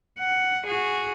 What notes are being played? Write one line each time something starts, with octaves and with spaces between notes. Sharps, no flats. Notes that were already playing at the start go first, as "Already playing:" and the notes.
F#5
F#4 G#4